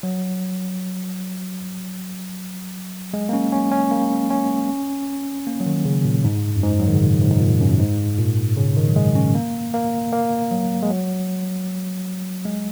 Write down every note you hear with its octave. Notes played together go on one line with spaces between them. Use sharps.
F#3
G#3
A#3
C#4
C#4
C#4
A#3
C#4
A#3
F#3
D#3
C#3
A#2
G#2
F#2
G#2
F#3
D#3
C#3
A#2
G#2
G#2
A#2
F#2
G#2
A#2
C#3
D#3
F#3
G#3
C#4
A#3
A#3
A#3
F#3
G#3
F#3
G#3